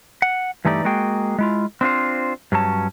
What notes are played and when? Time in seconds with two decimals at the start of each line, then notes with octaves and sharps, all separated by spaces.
0.22 F#5
0.65 G2 E3 A3 D#4 G4 D5
0.84 G#3 A#3 F#4 G#4 G5
1.39 G#3 E4 F4
1.81 C4 D4 F4 C5
2.52 G2 F#3 C#4 A5